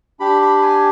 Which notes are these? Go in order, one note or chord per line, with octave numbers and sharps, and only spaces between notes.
D4 G4 B5
B5
B5
G#5